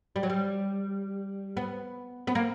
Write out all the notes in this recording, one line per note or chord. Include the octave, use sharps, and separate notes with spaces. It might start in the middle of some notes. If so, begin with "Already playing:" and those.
G3
F#3
G3
B3
B3
A#3